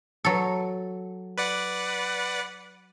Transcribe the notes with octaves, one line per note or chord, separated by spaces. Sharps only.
F#3 A4
B4 D5 F#5